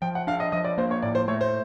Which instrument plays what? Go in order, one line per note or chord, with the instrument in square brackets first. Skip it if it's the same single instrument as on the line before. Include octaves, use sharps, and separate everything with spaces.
[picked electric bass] F3 [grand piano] G5
[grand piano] F#5
[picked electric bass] D4 [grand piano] F5
[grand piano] D#5
[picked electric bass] F3 [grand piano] D#5
[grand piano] D5
[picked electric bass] A#3 [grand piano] C5
[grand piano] C#5
[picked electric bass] A2 [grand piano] D5
[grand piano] C5
[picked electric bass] A3 [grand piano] C#5
[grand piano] C5